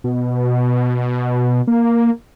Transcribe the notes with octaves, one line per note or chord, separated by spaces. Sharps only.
B2
A#3